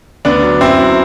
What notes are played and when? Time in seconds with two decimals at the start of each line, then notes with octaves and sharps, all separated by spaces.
0.25 D2 B3 D4
0.43 F#3
0.61 F#2 C4 E4
0.79 F#3